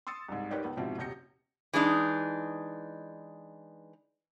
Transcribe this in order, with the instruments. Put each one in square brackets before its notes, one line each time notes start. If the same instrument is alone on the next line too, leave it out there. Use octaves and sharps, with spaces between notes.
[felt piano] C6 D#6 E6 A6 C#7
C2 G#2
D#4 G4 A#4 B4 C#5 D5
C#2 B3
G#2 B2 F3 C4 E4 G4
D#1 B2 G6 A#6 C#7
[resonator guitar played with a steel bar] E3 G#3 D4 D#4